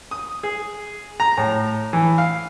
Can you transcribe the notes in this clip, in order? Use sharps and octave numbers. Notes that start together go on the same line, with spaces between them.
D#6
G#4
A#5
A2
E3
F5